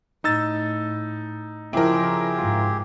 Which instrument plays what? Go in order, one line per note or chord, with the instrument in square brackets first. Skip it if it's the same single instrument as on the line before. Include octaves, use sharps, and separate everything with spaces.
[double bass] A2 [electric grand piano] D#4 E6 A6
[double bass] C#3 F3 [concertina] C4 G4 G#4 [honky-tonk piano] E4 A#4
[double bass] G#2 [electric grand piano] F4